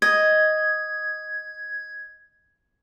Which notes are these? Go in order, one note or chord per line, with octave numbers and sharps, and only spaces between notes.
D#5 G#6